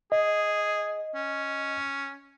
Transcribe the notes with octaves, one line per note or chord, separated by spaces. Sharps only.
G#4 D#5
C#4